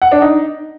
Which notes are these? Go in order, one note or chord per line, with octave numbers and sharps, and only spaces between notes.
F#5
D4
D#4